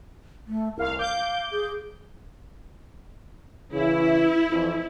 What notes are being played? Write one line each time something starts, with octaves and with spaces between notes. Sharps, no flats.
A3
C2 A#4 F5
F5 D6 G6
G#4
C#3 E3 E4
F2 E3